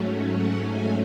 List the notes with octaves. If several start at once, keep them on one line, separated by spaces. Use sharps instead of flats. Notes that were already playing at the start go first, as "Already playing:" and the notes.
Already playing: G#2 F#3 A3 C#4
F#5
G#5